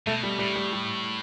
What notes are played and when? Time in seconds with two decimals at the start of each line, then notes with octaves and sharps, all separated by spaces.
0.07 B2 A3
0.23 G3
0.39 A2 G3
0.56 G3
0.73 G3